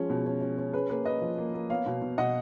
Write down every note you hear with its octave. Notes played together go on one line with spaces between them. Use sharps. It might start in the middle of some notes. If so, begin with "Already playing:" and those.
Already playing: F3 G#3 C#4
B2
C#4
C#4
C#4
C#4 G#4 B4
A#3 G#4 B4
C#4 B4 D#5
F3
A#3
A#3
B3 C#5 F5
B2
B2
B2 D#5 F#5